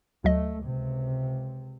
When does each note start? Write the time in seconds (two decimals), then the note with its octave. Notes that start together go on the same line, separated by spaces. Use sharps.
0.24 D2 F#3 A3 D#5
0.60 C#2 C3